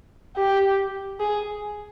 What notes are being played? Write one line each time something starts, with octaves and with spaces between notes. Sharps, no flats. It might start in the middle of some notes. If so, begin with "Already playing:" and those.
G4
G#4